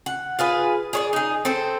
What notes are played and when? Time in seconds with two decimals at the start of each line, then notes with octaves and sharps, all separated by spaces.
0.06 F#5
0.39 F4 G#4 B4
0.93 G#4 C#5 D5
1.13 D#4 G#4
1.45 C4 A4 C5